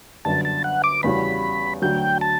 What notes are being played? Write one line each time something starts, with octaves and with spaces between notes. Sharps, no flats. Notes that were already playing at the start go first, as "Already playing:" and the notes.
G1 F#2 D3 A5
A5
F#5
D6
E2 C#3 G3 C#4 F#4 B5
D2 D3 F#3 G5
A5